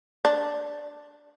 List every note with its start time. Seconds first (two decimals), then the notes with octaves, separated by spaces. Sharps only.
0.25 D4